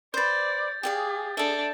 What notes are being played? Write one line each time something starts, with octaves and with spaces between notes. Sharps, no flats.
B4 C5 D5 G6 A6
G4 G#4 D5 F5
D4 A4 E5